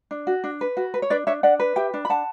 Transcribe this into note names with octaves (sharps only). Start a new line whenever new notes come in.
D4
F#4
D4
B4
F#4
B4
C#5
D4 B4 D5
D4 C#5 E5
D4 D5 F#5
B4
G4 E5 G5
D4
B5
D4 F#5 A5